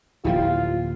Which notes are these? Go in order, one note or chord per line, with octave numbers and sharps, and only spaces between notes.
D1 F3 A#3 E4 F4 G4